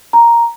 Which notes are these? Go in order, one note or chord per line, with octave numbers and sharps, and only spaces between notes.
A#5